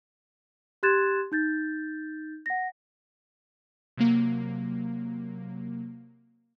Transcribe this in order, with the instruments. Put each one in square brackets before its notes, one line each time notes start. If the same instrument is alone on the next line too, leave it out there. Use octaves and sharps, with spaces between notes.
[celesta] G4 C6 F#6 G#6 A6 E7
D#4 G6 A6
F#5 A#6
[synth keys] C3 F#3 A#3